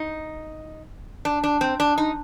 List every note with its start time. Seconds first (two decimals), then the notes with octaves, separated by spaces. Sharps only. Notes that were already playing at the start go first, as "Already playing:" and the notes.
Already playing: D#4
1.25 D4
1.44 D4
1.61 C4
1.80 D4
1.98 D#4